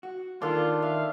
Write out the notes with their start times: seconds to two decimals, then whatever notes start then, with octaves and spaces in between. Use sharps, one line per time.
0.03 F#4
0.42 D#3 A#3 D4 F4 A4
0.82 E5 F5